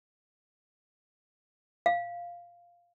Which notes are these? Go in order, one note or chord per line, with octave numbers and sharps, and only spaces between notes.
F5